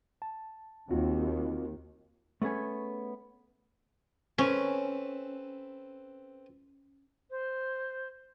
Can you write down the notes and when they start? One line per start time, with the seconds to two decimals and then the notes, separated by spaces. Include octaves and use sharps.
0.22 A5
0.90 D#2 D#3 C4 F4 F#4
2.42 A3 B3 C#4 G#4 C#5
4.38 C4 C#4 A4 B4
7.30 C5